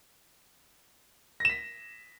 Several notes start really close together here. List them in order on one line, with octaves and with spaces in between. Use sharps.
A#6 E7 B6